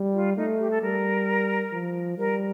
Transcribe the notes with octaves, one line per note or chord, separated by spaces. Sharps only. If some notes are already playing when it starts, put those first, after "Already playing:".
Already playing: G3
F4
A3 D#4
G4
A4
G3 A#4
F3
G3 A#4